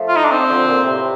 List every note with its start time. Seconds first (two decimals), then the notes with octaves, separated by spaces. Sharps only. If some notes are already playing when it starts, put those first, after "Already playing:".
Already playing: F3 A3
0.08 F4
0.16 D#4
0.24 D4
0.31 C4
0.49 D3 F3
0.67 A#2
0.84 A2 C3